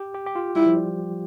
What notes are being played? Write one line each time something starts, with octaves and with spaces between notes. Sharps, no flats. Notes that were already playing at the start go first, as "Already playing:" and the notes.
Already playing: G4
G4
G4
F4
G3 E4
F3
G3